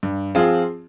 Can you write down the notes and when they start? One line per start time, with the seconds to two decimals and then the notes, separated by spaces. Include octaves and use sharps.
0.03 G2
0.35 F3 C4 F4 G#4